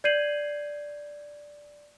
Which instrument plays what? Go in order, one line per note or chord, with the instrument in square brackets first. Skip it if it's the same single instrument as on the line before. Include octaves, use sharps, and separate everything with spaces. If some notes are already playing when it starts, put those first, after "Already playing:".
[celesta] D5 G6 G#6 C7 D#7 F#7